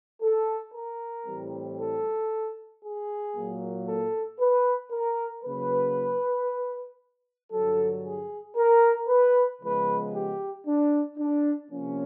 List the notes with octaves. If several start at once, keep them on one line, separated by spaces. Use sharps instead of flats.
A4
A#4
A2 E3 G3 C4
A4
G#4
A#2 F#3 A#3
A4
B4
A#4
C#3 F#3 A#3 B4
G2 D3 F#3 A4
G#4
A#4
B4
C#3 F3 G#3 B3 B4
G4
D4
D4
C3 F3 A#3 C#4